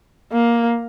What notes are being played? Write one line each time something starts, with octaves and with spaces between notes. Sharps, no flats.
A#3